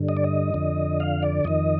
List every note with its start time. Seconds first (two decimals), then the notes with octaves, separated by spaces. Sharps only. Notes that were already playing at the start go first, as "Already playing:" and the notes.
Already playing: G2 D3
0.09 D#5
0.17 D5
0.24 D#5
0.54 F2 D3
1.00 F5
1.23 D5
1.45 F2 D#3 D#5